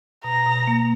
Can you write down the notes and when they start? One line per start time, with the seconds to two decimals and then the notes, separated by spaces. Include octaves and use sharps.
0.24 B2 A#5
0.46 B2
0.67 A#3